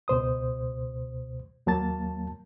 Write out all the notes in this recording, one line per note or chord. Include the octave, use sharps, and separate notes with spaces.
C#2 B2 C5 D#6
D#2 F#3 A#3 A5 A6